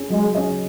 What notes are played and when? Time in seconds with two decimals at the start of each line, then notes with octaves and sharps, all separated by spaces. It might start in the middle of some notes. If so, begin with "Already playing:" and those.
Already playing: C#4 G#4
0.10 F#3 G#3
0.35 C#4 G#4 D#5